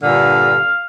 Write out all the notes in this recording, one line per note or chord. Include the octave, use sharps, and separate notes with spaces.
G2 A#2 D3 F5